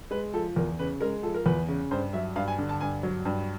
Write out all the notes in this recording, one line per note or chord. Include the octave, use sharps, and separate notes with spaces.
G#3 B4
F3 A4
E2 A#4
C#3 B4
G#3 A#4
F3 A4
A#4
E2 B4
C#3
G2 C5
F#3 E5
G2 F5
G#5
D3
A5
G2 G#5
F#3
G2